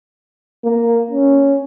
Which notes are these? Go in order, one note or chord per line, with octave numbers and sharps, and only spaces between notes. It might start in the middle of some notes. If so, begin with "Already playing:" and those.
A#3
C#4